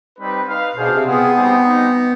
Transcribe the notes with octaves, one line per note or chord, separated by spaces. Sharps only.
G3 C4 D#4 B4
D#4 B4 F5
B2 D4 G#4 C5 F5
C3
B3 C4 F4 G#4
G3 C4 D#4 G#4
G3 C4 D#4